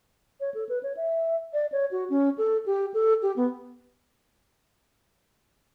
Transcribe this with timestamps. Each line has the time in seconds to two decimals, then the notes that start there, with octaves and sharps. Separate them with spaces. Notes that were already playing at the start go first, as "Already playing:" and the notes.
0.40 C#5
0.54 A4
0.69 B4
0.83 C#5
0.97 E5
1.53 D5
1.72 C#5
1.91 F#4
2.10 C#4
2.38 A4
2.66 G4
2.94 A4
3.22 G4
3.36 B3